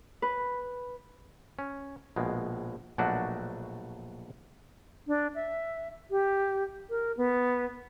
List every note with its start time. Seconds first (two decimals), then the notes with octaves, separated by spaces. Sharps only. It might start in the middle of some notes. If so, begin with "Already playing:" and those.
0.22 B4
1.59 C#4
2.16 A#1 B2 G#3
2.98 A#1 B2 F#3 A3 D4 F#4
5.08 D4
5.35 E5
6.11 G4
6.90 A#4
7.17 B3